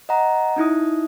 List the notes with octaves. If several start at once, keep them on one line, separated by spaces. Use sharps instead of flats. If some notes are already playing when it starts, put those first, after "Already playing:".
D#5 F#5 A#5
C#4 D#4 E4 D#6